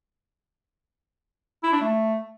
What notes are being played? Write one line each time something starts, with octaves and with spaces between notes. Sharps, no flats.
E4
D4
A3